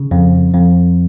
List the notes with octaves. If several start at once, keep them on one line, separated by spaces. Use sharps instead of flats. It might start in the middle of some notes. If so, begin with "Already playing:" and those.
Already playing: C#3
F2
F2